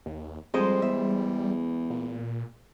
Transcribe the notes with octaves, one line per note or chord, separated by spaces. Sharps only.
D#2
F2 G3 G#3 C5 D#5
E2 E5
A#2